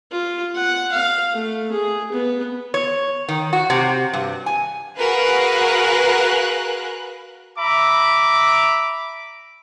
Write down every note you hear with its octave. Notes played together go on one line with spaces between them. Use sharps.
F4
F#5
F5
A3
G#4
B3
C#5
D#3
F#4
C3
G2
G#5
F#4 G#4 A#4 B4 F5 F#6
E5 A#5 B5 D6